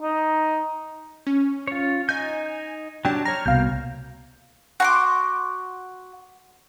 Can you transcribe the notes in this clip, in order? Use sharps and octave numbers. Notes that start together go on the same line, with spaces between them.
D#4
C#4
F4 C#5
D#4 D#5 G#5 G6
F#3 D4 G4 G5 A5
C#5 A#5 F6
C2 B2 A#3 F5 G6
F#4 C6 D6